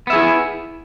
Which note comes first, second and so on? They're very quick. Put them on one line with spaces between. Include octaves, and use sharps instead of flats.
B3 E5 G#4 E4